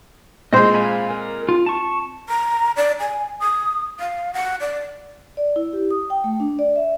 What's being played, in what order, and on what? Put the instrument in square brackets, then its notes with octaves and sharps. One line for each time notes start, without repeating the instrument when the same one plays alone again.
[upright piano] A#2 G#3 [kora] C4 C5 [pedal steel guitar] D#5
[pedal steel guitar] F5 G#5 B5
A#4
F4
A5 C#6
[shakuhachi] A#5
D5
G#5
D#6
F5
F#5
D5
[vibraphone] D5
E4
G4
D#6
G5
A3
D4
D5
E5